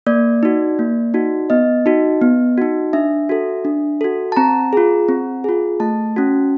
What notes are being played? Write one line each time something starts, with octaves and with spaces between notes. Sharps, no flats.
A#3 D5
D#4 F#4
A#3
D#4 F#4
B3 D#5
D#4 F#4
B3
D#4 F#4
D4 E5
F#4 A4
D4
F#4 A4
A5
C4 A#5
F4 G#4
C4
F4 G#4
A3 A5
C#4 F#4